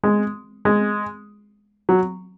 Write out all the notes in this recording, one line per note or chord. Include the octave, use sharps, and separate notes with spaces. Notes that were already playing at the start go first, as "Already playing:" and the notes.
G#3
G#3
F#3